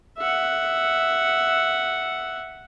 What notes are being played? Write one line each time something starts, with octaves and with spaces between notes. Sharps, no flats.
E5 F#5